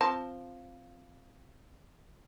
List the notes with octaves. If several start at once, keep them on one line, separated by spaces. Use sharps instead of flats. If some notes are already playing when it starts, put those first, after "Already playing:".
F3 C4 A5